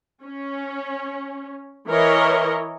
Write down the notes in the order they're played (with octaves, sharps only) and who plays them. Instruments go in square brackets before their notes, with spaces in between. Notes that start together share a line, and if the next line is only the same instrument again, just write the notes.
[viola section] C#4
E3 A#4 C#5 D#5